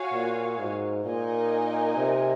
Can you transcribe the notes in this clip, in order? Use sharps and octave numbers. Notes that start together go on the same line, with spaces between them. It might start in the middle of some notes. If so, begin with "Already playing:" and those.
Already playing: F#4 C#5 F5 G#5
A#2
G#2
A#2 D#4 A#4 D#5 G#5
C3